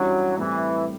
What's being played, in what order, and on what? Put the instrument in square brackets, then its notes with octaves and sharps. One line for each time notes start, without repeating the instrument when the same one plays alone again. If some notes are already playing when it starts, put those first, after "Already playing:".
Already playing: [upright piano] F#2 E3 G3 D4 F#4 [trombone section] F#3
[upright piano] A2 G3 C4 [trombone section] E3